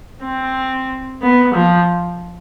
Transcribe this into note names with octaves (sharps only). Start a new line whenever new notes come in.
C4
B3
F3